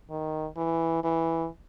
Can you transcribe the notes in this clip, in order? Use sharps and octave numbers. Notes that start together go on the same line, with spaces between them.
D#3
E3
E3